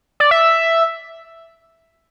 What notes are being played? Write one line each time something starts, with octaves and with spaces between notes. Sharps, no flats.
D5
E5